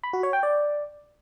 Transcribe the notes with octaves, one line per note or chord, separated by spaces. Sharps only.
B5
F#4
C#5
G5
D5